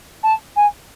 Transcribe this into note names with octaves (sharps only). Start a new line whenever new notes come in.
A5
G#5